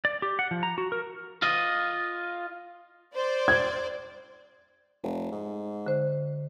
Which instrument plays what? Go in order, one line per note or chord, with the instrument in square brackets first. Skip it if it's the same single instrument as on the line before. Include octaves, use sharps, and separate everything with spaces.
[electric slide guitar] D5
G4
F#5
F3
A#5
F#4
A#4
[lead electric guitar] F4 D#5
[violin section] C5 D5
[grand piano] G#6
[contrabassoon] F1
G#2
[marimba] D3 C5